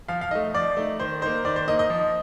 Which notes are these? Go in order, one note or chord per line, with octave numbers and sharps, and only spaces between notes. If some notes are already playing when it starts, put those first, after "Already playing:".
F3 F5
F5
A3 D#4 D#5
F3 D5
A3 D#4
D#3 C5
A#3 D#4 C5
D#3 D5
C5
A#3 D#4 D#5
D#5
F3